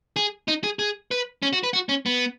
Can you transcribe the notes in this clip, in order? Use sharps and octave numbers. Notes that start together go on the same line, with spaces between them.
G#4
D#4
G#4
G#4
B4
C#4
F#4
B4
F#4
C#4
B3